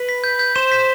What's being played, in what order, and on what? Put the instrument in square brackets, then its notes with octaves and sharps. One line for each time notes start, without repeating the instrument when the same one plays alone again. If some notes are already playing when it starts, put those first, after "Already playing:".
Already playing: [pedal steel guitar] B4
[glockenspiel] B6
G6
G6
[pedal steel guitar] C5 [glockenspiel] E7
[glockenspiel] B6